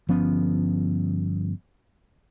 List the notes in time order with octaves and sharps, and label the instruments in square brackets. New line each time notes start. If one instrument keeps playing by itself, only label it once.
[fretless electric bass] G1 F3 B3 C#4